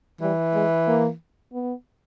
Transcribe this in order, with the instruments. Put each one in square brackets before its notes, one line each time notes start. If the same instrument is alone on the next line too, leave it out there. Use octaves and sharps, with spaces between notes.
[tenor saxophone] E3 [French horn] G3
[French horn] G#3
A#3
B3